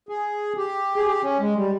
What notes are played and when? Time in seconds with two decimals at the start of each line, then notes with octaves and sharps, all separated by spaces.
0.09 G#4
0.57 G4
0.96 G#4
1.07 G4
1.23 C#4
1.39 G#3
1.56 G3